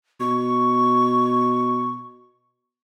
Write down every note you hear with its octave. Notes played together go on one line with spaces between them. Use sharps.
B2 C#6